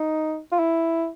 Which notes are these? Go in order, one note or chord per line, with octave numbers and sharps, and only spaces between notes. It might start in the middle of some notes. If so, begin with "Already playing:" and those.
Already playing: D#4
F4
E4